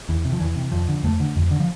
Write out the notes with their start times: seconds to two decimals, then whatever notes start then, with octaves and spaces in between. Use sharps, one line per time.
0.09 E2 E3
0.25 C3
0.33 F3
0.40 E2 E3
0.56 C3
0.72 F2 F3
0.88 D3
1.03 F2 A3
1.20 D3
1.36 F2
1.51 D3
1.60 F3